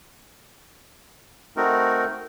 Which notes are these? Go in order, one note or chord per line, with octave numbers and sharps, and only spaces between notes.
A3 C4 D#4 F#4 A#4